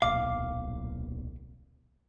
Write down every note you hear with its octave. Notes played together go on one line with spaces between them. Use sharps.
D1 B1 A#2 F5 D6